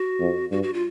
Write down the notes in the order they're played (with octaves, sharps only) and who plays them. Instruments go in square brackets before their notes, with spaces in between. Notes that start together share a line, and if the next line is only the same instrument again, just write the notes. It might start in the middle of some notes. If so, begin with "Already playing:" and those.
Already playing: [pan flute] F#4
[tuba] F2
[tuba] G2 [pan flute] F#4
[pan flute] F#4
F4